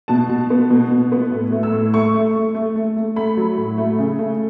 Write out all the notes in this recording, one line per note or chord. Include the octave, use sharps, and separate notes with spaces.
B2 A5
B2
B3
B2
B2
B3
A2
A3
E6
A2
A3 C#6
A3
A3
A3
A3
A3
A3 B5
F#3
A2
A3
C#3
A3